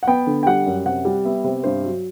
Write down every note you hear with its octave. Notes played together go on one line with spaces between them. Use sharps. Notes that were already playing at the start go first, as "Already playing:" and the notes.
F#5
B3 G5
D3
G5
G3 F#5
F#2
C3 F#5
G3
B3 E5
C3
G2 C5
F#3